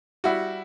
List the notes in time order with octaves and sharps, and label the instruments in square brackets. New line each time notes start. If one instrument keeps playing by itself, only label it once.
[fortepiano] G3 E4 F#4